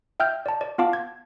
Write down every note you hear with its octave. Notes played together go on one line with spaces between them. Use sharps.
E5 G5 F6 G6
D5 A5
D5
B3 F4 F5 A5 D6
G#6